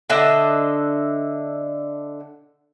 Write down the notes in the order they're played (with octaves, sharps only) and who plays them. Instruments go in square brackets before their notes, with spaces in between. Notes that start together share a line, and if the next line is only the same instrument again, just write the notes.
[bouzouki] D3 D4 D#5 E5